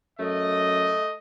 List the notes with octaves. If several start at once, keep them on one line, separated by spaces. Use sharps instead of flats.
F#2 A3 D#5